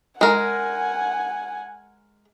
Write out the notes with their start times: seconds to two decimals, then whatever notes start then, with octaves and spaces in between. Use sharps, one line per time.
0.21 G#3 A#4 F#5 G#5